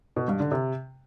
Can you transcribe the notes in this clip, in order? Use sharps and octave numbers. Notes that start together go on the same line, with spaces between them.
B2
G2
D3
C3